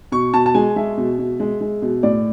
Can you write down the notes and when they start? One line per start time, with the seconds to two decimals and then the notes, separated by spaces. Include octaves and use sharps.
0.12 B2 C#6
0.33 B2 A5
0.46 A5
0.54 G#3 G#5
0.76 G#3 E5
0.97 B2
1.19 B2
1.40 G#3
1.61 G#3
1.82 B2
2.03 A2 D5